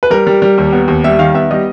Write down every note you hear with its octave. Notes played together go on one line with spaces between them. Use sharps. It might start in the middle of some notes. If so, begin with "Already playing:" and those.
B4
G3 A#4
G3
G3
D#2
B3
D#2
G3 E5
D#3 F5
B3 E5
G3 D#5